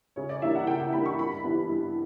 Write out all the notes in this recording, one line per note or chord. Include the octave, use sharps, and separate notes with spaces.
C#3 C#5
D5
E3 G3 A#3 D4 E5
F#5
C#3 G5
G5
E3 G3 A#3 D4 B5
C#6
G2 B5
E3 G3 B3
G2